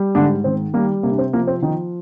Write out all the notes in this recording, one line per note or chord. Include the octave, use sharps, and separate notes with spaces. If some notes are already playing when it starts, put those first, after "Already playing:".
Already playing: G3
G#2 D3 D4
D#3 C4
G3 A#3
C3 A#3
D4
C4
F3 A#3
C4
D#3 F3 D#4